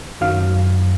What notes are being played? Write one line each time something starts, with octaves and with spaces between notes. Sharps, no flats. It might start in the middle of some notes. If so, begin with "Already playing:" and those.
F#2 D#3 F#3 F5